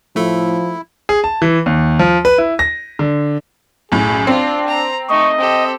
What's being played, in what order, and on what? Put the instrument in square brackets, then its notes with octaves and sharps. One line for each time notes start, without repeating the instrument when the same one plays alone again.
[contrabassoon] A2 [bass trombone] F3 [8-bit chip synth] A3 A4 [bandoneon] E4
[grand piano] G#4
A5
E3
D#2
F3
B4
E4
A#6
D3
[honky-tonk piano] B1 F#2 A2 [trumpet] G#4
[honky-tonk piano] C4 [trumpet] D4 [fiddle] F4
[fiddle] A#5
[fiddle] A3 D#4 [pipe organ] D#5 [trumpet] C#6
[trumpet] C4 [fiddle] G4 A4